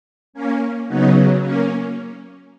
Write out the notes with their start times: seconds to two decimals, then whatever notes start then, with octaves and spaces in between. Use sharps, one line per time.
0.33 A#3 C#4
0.87 C#3 F#3 B3 D#4
1.42 A#3 C#4